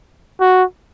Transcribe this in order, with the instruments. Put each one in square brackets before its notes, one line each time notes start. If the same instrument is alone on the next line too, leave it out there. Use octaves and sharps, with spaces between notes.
[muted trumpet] F#4